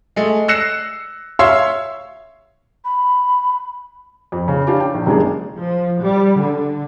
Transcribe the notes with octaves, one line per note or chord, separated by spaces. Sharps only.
G#3 A3
E6 F#6 A#6 C7 C#7 E7
C#5 E5 F5 C6 E6 C7
B5
F2
C#3
C#4 D4 F4 G4
G5
A#1
F#1 G3 G#3 A#3 D4 G#4
F3
G3
D3